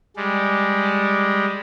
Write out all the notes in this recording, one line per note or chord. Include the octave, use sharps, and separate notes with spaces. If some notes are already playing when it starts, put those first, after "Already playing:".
G3 G#3